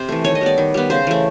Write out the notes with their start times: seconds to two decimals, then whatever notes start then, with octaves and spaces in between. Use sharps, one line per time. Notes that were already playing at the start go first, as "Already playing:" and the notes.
Already playing: C3 C5
0.09 E3 A3
0.24 D#3 C#5
0.35 D#5
0.41 G3 B3 D5
0.58 D#3
0.74 G3 B3
0.90 C#3 C5
1.07 E3 A3